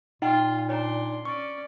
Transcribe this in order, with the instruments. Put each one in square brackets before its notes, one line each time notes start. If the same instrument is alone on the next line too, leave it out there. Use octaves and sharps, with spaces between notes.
[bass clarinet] A#2 [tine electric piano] D#4 [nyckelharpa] F4 [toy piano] F#5 G5
[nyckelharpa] D4 C6 [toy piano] C#5 A#5
[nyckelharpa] C#4 D5 [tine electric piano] C#6